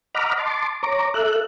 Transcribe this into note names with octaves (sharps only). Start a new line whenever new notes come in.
D#5 F#5 A#5 B5 D6 F6
A5 C6 D6
C#5 A#5 D6
A4 E5 F#6